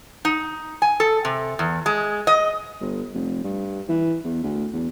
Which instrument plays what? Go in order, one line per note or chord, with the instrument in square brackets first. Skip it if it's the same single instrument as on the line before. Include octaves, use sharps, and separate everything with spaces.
[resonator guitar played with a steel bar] D#4
G#5
A4
C3
E2
G#3
D#5
[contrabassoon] G1
F1
G2
E3
E2
D2
E2